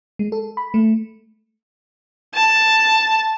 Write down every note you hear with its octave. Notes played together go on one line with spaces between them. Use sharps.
G#3
A4
B5
A3
A5